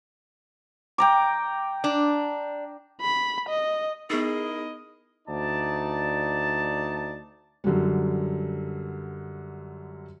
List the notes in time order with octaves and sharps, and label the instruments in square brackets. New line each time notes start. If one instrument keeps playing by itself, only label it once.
[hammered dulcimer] G5 A#5 D6
[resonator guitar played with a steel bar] D4
[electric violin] B5
D#5
[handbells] B3 D#4 [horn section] E4 A#4 D#5 [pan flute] G#4
[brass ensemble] D2 D#4 D5 A5
[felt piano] F#2 D3 F#3 G3